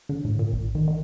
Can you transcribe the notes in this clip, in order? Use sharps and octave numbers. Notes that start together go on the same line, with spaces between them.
D3
A2
A#2
A1
D#3
D#3